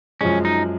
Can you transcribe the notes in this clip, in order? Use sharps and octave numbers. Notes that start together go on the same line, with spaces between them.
F#2 F3 G#3 C#4
D#4